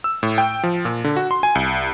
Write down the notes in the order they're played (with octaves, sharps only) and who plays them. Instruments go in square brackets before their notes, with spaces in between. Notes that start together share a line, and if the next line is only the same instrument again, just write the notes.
[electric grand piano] E6
A2
G5
F3
A#2
D3
F#4
C6
G#5
C2